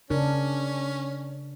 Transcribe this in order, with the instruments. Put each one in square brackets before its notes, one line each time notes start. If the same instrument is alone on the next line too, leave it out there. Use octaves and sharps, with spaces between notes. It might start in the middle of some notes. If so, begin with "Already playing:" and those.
[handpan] C#3 D4 A#4 [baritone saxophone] C#4